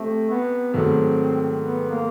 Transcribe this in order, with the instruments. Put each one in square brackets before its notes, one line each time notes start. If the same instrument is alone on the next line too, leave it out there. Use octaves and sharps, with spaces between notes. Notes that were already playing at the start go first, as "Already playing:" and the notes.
Already playing: [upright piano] C3 C4 [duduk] A3
[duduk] B3
[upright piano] G#2 D#3 F#3 A3 [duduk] C4
[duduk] B3
A#3